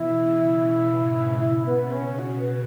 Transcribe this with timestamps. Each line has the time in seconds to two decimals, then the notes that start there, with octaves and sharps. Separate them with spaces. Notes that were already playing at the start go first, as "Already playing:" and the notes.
Already playing: B2 E3 E4
0.18 C#3
0.57 B2
0.99 G#2
1.38 B2 E4
1.66 B3
1.78 C#3
1.91 C#4
2.18 B2 F#4
2.39 B4